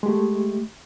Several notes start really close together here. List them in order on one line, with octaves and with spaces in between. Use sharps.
G#3 G4 A3